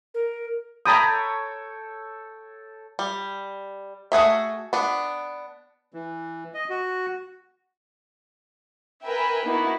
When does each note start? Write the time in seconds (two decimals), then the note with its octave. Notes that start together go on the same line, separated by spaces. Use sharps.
0.14 A#4
0.85 A4 C#5 G5 A#5 B5 D#6
2.99 G3
4.12 A3 F#4 G#4 E5
4.73 B3 D4
5.94 E3
6.54 D#5
6.70 F#4
9.05 A#4 B4 E5 G5 G#5
9.45 A#3 B3 D#4 E4 F#4